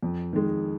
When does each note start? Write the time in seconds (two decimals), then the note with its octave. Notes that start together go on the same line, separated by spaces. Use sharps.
0.03 F2
0.33 D#3 G#3